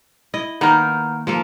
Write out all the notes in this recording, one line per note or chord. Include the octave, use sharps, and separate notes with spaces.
E4 D#5
D#3 A#3 B3 D#4 A#4
F3 A#3 A4